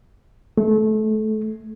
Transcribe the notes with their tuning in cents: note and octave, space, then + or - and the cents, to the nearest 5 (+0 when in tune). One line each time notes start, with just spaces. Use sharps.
A3 -25